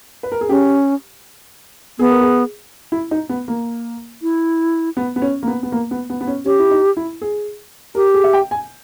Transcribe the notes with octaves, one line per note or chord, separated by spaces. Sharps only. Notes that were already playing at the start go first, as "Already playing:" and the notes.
B4
A#4
G#4
C#4 G4
B3 G#4
A#4
G#4
E4
D#4
B3
A#3
E4
B3
B3
C#4
A#3
B3
B3
A#3
B3
B3
B3
C#4
C#4 G4
E4
D#4
E4
G#4
G4 A#4
G#4
E5
G5
G#5